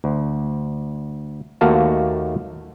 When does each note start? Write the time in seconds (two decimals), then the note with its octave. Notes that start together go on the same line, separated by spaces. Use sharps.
0.04 D2
1.61 D#2 A3 A#3 F#4 F5 A5